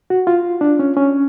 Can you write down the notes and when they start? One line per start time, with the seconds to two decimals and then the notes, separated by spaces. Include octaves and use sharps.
0.10 F#4
0.27 F4
0.61 D4
0.79 C#4
0.97 C#4